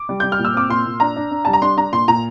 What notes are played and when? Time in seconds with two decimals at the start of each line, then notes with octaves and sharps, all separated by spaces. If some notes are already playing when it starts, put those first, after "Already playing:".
Already playing: D6
0.09 G3
0.20 G3 G6
0.32 F6
0.39 A#2
0.45 E6
0.54 C4 D6
0.69 A#2 C6
0.86 A#2
1.00 D4 A#5
1.16 D4
1.31 D4
1.45 G3 A5
1.53 A#5
1.62 D4 C6
1.77 D4 A#5
1.92 A#2 C6
2.08 A#2 A#5